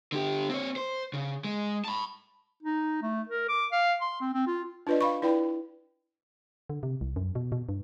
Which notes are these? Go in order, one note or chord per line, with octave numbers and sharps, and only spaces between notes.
D3 G4
C4 C#5
C5
C#3
G#3
A5 B5
D#4
A3
A#4
D6
F5
C6
C4
C4
F4
D4 F4 B4 D5 D#5
F5 B5 C#6
E4 B4 D5 G5 B5
D3
C3
C2
F#2
B2
B2
G2